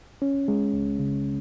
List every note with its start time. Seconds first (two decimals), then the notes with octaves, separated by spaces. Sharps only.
0.22 C#4
0.48 G#3
0.73 C#2
0.99 C#3